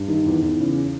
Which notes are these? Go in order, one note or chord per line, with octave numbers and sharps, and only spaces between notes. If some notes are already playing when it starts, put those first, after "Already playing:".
Already playing: G2
D#3
E2
E2
C#3